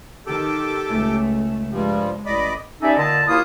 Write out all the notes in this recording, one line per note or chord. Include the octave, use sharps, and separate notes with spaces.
D#3 G4 A4 D6
C#2 A3
G2 F3 G3 G#3
A1 D5 D#5 B5
G3 C#4 D#4 A4 D5 E5
A#2 D3 D#5 A5
D#2 A#3 E4 F4 D#6